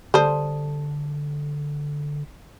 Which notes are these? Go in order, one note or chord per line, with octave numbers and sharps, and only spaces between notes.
D3 G3 A4 C5 A5